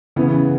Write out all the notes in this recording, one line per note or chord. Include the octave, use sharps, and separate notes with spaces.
C#3 E3 B3